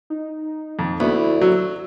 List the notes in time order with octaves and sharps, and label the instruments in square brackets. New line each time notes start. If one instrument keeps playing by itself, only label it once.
[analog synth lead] D#4
[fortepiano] F2
[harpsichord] D2 [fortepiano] B3 [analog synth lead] E4
[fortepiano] F#3 [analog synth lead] E6